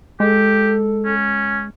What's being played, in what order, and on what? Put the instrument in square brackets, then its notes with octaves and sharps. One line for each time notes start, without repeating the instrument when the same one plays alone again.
[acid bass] G#3 [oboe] G4 [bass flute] A4
[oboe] C#4